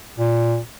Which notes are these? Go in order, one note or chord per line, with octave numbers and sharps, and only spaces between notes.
A#2